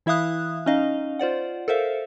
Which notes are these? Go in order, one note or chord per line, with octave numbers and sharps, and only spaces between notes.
E3 E4 E5 F5 D#6 F#6
C#4 D#4 D#5 F5
F4 C5 D5 F#5
A4 A#4 C5 E5 F5